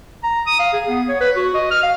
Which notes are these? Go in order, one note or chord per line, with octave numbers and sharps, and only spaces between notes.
A#5
D#6
F5
G#4
B3
C#5
B4
F#4
D#5
F6
F5